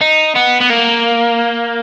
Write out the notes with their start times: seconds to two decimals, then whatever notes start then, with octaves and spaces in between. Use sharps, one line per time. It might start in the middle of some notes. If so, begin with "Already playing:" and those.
0.01 D#4
0.36 B3
0.61 B3
0.70 A#3